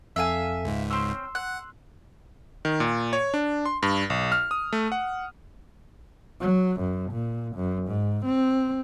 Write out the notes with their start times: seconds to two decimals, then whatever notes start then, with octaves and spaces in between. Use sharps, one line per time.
0.16 F2 A4 E5 F5 G#5
0.65 C#2 G#2
0.90 C4 C#4 C6 E6
1.35 F#5 F#6
2.65 D#3
2.80 A#2
3.13 C#5
3.34 D4
3.66 C6
3.83 G2
4.10 B1
4.32 F6
4.51 D#6
4.73 A3
4.92 F#5
6.41 F#3
6.80 F#2
7.12 A#2
7.56 F#2
7.88 G#2
8.25 C4